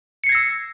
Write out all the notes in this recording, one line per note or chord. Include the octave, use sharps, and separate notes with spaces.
E6 G#6 A#6 C7 C#7